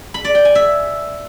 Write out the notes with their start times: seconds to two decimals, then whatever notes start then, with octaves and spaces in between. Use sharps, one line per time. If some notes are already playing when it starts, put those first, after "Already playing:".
0.14 B5
0.24 D5
0.35 G5
0.45 G#5
0.55 E5